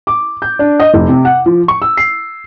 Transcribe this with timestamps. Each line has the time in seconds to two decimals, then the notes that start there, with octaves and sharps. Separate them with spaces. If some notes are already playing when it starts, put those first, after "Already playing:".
0.07 D6
0.42 G6
0.59 D4
0.80 D#5
0.94 F1
1.09 C3
1.25 F#5
1.46 F3
1.68 C#6
1.82 E6
1.97 C7